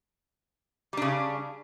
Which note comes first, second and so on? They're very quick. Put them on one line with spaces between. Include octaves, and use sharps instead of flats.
G3 D4 C#3